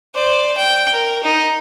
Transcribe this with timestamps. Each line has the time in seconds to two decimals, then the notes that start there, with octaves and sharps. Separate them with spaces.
0.15 C5 D5
0.57 G5
0.92 A#4
1.24 D#4